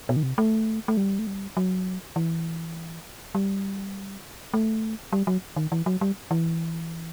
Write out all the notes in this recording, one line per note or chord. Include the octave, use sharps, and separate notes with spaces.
B2
D#3
C3
A3
A3
G3
A3
G3
F#3
E3
G3
A3
G3
F#3
D#3
E3
F#3
G3
E3